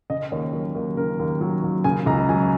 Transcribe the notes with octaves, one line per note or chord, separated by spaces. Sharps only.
C#3 D#5
D#2 C#5
F#3 A#4
D#2
C#3 A#4
D#2
F#3
D#2
C#3 G#5
C#2 A#5
F#3 G#5